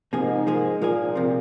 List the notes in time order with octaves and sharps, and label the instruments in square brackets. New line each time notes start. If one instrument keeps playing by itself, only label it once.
[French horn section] G#2 [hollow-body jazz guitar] C3 F3 A#3 G#4
[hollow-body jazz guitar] F3 A#3 G#4
[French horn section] A#2 [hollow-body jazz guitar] F3 A#3 G#4
[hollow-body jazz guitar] C3 F3 C4